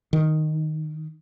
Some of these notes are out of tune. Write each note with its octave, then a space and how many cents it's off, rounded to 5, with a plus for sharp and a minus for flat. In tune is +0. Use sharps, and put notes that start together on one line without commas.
D#3 -5